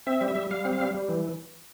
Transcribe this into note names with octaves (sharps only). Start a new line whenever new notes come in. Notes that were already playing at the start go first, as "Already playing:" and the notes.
C4 E5
G3
E5
G3
G3 F5
C4
F5
G3
G3
E3